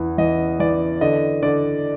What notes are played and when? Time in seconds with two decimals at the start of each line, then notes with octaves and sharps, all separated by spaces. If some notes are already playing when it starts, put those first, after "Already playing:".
Already playing: E2 E3
0.18 E3 D#5
0.59 E3 D5
1.01 D3 D#5
1.43 D3 D5